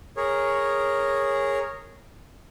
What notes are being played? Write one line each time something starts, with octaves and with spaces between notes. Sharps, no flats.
G#4 A#4 C#5